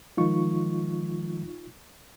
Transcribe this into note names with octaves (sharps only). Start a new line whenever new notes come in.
D#3 F3 G#3 D#4 F4 C#6